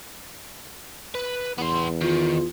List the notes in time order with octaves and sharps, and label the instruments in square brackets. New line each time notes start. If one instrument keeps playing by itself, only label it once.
[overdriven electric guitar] B4
[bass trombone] E2 [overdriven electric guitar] B3 C6
[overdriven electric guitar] D#3 [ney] F4